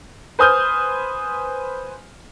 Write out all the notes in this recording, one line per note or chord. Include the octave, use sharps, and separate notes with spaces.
B4 C5 G#5 D#6 F6 G6